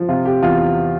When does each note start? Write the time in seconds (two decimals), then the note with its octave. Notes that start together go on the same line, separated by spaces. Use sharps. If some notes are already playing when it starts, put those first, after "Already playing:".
Already playing: F3
0.09 C3 F4
0.25 G4
0.42 E2 F4